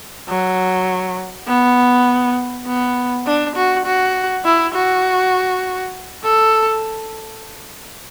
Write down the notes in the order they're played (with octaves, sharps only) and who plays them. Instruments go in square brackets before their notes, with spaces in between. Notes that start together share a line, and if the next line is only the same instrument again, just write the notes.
[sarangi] F#3
B3
B3
D4
F#4
F#4
E4
F#4
A4